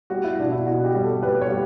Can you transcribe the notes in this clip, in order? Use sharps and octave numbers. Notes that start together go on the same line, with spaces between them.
G3 F#4
E4
B2 D4
E4
B2 F#4
G4
G3
A4
G3 B4
C#5
G3